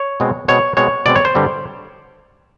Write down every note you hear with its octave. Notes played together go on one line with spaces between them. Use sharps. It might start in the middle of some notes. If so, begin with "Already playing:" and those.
Already playing: C#5
B2 G#3 C4
B2 G#3 C4 C#5
B2 G#3 C4 C#5
B2 G#3 C4 D5
C#5
C5
G2 D3 G3 C4